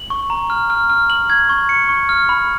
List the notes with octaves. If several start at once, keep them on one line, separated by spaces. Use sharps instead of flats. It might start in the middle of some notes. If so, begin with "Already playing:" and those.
Already playing: F#7
C#6
A#5
F6
F6
F6
F#7
G#6
C#6
C#7
C#6
F6
B5